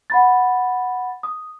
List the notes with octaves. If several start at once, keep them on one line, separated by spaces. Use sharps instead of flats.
F#5 B5 A6
D#6